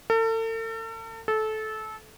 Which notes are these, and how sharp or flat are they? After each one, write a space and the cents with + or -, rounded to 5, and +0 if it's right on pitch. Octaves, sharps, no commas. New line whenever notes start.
A4 +40
A4 -20